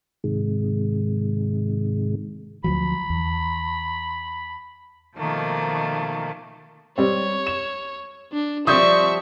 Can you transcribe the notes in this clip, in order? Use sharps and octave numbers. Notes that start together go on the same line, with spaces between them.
G#2 C3 D#3 G#3
D2 F3 F#3 B5
E2
B2 D#3 F3 A3 A#3
G3 C4 C#5
E7
D4
F3 G3 C4 E5 C#6 D#6 G6